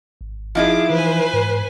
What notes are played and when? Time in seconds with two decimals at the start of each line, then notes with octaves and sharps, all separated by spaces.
0.21 G#1
0.55 F3 D#4 E4 G#4 D6
0.90 E3 B4 C5 G#5
1.33 G#2